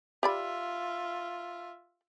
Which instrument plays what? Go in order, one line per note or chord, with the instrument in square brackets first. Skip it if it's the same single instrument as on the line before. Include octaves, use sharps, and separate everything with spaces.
[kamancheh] F4 E5 [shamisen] G4 D5 B5